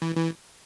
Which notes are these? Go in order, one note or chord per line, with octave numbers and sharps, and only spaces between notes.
E3
E3